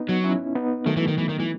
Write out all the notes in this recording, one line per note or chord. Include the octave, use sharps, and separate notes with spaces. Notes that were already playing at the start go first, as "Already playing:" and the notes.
Already playing: B3 D#4
F#3
C#4 E4
B3 D#4
D#3 F#3 A3
E3
D#3
E3
D#3
E3